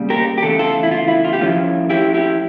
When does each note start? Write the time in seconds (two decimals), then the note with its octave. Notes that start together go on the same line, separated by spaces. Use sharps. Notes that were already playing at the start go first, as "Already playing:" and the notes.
Already playing: C#3 G3 A#3
0.10 G4 A#4
0.38 G4
0.43 E2 C#3 A3 A4
0.59 F4 A4
0.83 E4
0.91 F4
1.08 E4
1.25 F4
1.33 G4
1.40 A2 F3 C#4 E4 F4
1.90 E4 G4
2.14 E4 G4